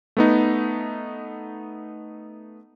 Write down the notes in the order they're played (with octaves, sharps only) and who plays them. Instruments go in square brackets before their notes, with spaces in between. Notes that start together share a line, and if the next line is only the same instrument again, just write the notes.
[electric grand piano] A3 B3 D#4